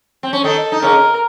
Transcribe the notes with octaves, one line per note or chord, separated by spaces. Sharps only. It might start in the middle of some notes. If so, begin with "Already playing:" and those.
C4
C#4
D#3 D#4 A4
D#4
C#3 C#4 A#4